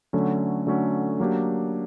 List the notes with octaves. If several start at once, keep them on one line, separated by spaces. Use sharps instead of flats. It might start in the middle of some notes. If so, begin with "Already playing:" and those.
D3 F#3 A3 C#4
D3 F#3 A3 C#4
F#3 A#3 D4 G4